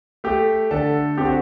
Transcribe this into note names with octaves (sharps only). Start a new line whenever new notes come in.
A3 G4
D3 A4
C4 G4
F#4